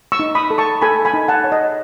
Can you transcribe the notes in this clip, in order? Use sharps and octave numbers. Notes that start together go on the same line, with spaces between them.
C#6 E6
D#4
B5 D#6
A4
A5 C#6
A4 G#5 B5
G#5 B5
D#4
F#5 A5
C#5
D#5